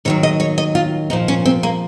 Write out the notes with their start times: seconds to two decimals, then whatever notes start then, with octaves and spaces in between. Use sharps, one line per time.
0.05 D#2 D#3 F#3 C#5
0.23 D#5
0.40 C#5
0.58 D#5
0.75 F4
1.10 A#2 F3 D#4
1.28 C#4
1.45 C4
1.63 A#3